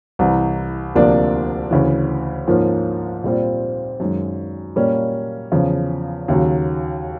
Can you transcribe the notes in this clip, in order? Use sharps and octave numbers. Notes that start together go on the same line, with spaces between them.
C2 C3 E3
D2 C3 F3 A#3 D4
D2 C#3 E3
G#2 F3 A#3 C#4 F4
A#2 G3 C4 F4
F#2 D#3 G#3
A#2 G3 A#3 C#4
E2 C#3 F3
D#2 C#3 F#3